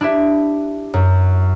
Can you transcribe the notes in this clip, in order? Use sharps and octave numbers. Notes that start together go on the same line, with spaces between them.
D4 E4 G4 E5
F#2